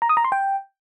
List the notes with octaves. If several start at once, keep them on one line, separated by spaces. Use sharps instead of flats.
A#5
D#6
A#5
C6
G5